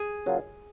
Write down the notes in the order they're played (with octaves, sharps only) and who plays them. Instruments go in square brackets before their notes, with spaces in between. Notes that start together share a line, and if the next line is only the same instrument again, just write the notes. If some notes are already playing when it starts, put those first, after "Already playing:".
Already playing: [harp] G#4
[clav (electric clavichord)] C#3 F#3 A#3 F4